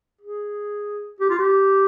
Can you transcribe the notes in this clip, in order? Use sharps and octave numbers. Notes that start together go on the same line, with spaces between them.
G#4
G4
F4
G4